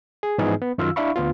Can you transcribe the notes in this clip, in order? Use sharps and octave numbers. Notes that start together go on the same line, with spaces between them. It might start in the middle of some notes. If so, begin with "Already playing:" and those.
G#4
G#2 E3 F3 B3 D#4 G#4
B3
F#2 D#3 F4 F5 E6
D4 E4 E5 F5 B5 C#6
D2 B3 F4